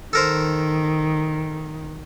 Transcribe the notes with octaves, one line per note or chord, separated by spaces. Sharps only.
D#3 A4 A#4 C5